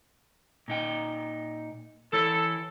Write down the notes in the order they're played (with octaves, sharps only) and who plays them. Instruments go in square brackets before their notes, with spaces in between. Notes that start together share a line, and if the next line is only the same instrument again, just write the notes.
[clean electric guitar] A#2 D#4 G5
[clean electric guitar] E3 E4 C#5 [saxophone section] A4